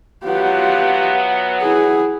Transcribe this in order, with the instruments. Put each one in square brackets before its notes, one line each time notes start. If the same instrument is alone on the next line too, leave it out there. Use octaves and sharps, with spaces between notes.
[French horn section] F#3 B3 [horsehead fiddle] F4 G4 [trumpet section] E5 F#5
[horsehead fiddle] E4 G#4